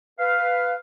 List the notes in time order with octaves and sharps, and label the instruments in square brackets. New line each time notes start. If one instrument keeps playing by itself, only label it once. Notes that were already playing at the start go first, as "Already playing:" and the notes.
[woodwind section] B4 F5